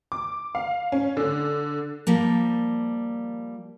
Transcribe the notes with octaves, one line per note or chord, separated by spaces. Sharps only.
D6
F5
C#4
D3
F3 G3 A#3